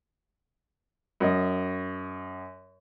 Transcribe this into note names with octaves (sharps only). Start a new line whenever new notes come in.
F#2 D#5